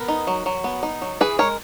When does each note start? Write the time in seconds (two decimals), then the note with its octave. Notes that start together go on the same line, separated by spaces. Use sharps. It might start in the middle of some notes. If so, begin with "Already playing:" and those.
Already playing: B3 A#4
0.08 D#4
0.27 F#3
0.46 F#3
0.64 B3
0.83 D#4
1.02 F#3
1.21 E3 G#4 B4
1.39 G#3 A#4 C#5